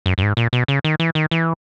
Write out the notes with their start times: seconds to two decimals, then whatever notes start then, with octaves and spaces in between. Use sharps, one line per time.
0.06 F#2
0.18 F#2
0.23 G#2
0.37 A#2
0.53 B2
0.68 C#3
0.84 D#3
1.00 E3
1.15 D#3
1.31 E3